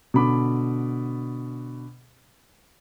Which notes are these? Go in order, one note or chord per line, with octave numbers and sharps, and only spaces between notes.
B2 D3 B5 D6